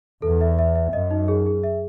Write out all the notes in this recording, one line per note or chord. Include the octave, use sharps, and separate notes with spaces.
E2 A4
E5
E5
E5
F#2 D#5
D#4
G#4
G#4
E5